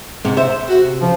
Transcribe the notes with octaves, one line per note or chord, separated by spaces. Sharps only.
G#2 C3
C5 E5
F#4
C3
C#3 F3